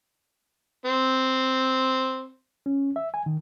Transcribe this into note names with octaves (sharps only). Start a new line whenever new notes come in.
C4
C#4
E5
G#5
D#3